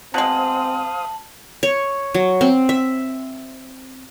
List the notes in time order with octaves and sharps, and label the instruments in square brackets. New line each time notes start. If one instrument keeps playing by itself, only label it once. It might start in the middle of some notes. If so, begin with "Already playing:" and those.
[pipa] B2 G#3 [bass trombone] C4 [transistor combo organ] C5 F5 D#6 [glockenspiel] A5 F#7
[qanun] C#5
F#3
C4
E5